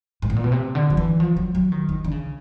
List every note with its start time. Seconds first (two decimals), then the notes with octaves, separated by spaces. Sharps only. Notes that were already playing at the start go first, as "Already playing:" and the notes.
0.22 G#2
0.30 A2
0.36 A#2
0.44 B2
0.52 C3
0.75 D3
0.90 F3
0.97 E3
1.20 F3
1.37 F#3
1.55 F#3
1.72 D#3
1.89 D#3
2.04 D3
2.11 C#3